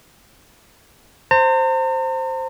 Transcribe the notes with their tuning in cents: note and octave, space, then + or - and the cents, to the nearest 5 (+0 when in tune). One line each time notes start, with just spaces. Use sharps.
C5 +0 A#5 -45